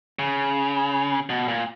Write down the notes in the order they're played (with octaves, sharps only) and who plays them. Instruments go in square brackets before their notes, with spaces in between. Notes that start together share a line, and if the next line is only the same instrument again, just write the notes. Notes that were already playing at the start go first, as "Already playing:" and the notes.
[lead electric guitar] C#3
B2
A#2